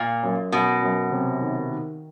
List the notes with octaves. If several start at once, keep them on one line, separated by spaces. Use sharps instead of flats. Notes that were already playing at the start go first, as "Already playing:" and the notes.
Already playing: A#2
F#2
F#2 B2
F#2
C3
D#3
D#3